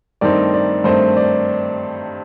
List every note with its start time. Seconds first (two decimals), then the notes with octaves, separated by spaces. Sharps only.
0.21 G2 D#3 A3 C4 D#4 D5
0.54 D5
0.84 G2 D#3 A3 C4 D#4 C5
1.17 D5